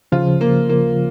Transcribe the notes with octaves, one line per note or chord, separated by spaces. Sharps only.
C#3 F3 F4
A#3
A#3